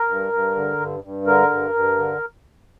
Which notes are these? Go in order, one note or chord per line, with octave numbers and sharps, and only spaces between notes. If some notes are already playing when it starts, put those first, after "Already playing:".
Already playing: A#4
G2
G2
D3
G2
G2
D3 A#4
G2
G2
D3